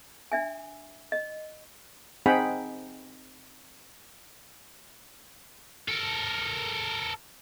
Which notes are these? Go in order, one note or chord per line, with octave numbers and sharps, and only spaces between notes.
D4 E5 G#5
D#5
C4 D#4 G#4 F#5 G5 B5
A4 A#4